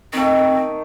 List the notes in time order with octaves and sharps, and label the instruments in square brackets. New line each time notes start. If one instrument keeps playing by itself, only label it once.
[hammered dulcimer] D#3 A3 [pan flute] C4